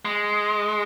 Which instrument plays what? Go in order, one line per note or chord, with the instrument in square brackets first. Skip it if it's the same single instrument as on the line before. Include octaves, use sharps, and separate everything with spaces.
[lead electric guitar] G#3